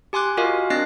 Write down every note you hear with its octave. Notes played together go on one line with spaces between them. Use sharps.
G4 G#5 C6 D6 F#6
F4 F#4 A#4 D#5 F5 G#5
C4 D4 D#5 F#6 A#6 C7